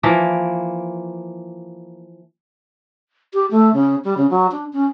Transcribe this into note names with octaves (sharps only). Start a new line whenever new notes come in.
E3 F3 A#3
G4
A3
C#3
G3
C#3
F#3
D4
C#4